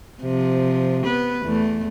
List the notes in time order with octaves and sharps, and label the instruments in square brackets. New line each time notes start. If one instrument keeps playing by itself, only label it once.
[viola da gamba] C3 F3
B3 B4
E2 E3 A3